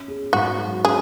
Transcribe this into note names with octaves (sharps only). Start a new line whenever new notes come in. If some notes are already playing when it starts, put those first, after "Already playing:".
Already playing: C#4
G#4
G#2 F#4
F#3
C#4 G#4